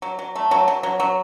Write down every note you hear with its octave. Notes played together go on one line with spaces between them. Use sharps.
F#3
F#3
A3
F#3
F#3
F#3
F#3